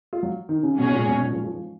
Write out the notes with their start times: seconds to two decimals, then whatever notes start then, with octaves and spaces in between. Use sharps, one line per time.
0.13 F4
0.23 F#3
0.49 D#3
0.63 C#3
0.78 G#2 B2 F#3 C#4 G#4 C#5
0.92 A#2
1.07 B2
1.22 A#2
1.32 F3
1.44 F3
1.54 F3